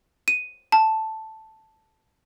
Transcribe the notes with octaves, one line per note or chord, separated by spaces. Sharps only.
D#7
A5